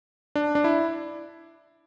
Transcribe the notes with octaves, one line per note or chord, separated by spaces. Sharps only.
D4
D4
E4